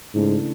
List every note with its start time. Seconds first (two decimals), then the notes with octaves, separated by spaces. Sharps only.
0.14 G#2 C#3 E3 A3 D4